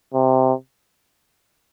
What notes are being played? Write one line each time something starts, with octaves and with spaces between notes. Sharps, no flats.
C3